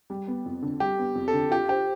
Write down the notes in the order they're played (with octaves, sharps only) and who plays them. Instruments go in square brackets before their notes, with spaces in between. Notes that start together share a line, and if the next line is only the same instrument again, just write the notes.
[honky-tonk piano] G3
B3
F2
D3
[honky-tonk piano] G3 [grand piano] G4
[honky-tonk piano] B3
F2
[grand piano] A4
[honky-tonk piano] D3
[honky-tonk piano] F4 [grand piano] G4
[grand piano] G4 [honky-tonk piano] C5